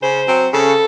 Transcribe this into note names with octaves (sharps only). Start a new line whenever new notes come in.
C#3 C5
F#3 C4
C#3 A4